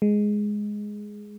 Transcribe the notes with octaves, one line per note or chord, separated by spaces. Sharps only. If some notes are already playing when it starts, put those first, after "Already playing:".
G#3